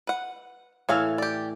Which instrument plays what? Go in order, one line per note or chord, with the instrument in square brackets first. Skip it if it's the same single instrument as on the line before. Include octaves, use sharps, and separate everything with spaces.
[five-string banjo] B4 F#5
[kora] A2 E3 A4 [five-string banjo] C#5 F5 G#5
[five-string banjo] G4 D5